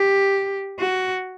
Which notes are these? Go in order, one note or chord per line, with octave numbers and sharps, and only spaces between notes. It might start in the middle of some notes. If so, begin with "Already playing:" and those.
Already playing: G4
F#4